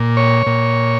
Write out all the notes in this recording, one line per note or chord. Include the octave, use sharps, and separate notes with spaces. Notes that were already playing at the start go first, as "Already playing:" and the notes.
Already playing: A#2
C#5
A#2